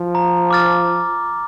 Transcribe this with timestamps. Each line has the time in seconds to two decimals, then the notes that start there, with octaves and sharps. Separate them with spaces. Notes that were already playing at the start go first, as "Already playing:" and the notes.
Already playing: F3
0.15 A#5
0.50 D6 F6 A6